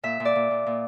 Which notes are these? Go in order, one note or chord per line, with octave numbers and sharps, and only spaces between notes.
A#2 E5
A#2
D5
A#2
A#2
A#2